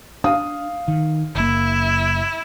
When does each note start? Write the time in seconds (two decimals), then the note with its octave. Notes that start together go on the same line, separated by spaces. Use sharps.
0.24 D4 F5 D#6
0.88 D#3
1.35 F#1 A#3 E4